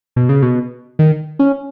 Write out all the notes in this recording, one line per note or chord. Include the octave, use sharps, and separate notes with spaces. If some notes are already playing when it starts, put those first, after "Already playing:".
B2
C#3
B2
D#3
C#4